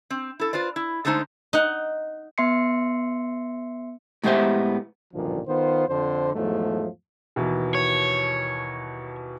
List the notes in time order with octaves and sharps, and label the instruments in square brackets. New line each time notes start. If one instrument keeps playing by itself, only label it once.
[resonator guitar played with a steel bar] C4
E4 A4
F4 B4 C5 D5
E4
D3 G#3 A3 D#4 C5 A5
[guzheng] D#4 F#5
[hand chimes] B3 E5 C6 C7 C#7
[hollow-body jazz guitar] A2 G#3 B3 G4 C5 E5
[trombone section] A1 D2 G2 A#2 D#3 F3
D#3 B3 F4 C5
F2 D3 C5
E2 G#2 F3 F#3 A3
[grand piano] D#2 B2 E3
[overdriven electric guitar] C#5